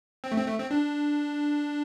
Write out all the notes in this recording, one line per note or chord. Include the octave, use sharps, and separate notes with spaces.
C4
A3
C4
A3
C4
D4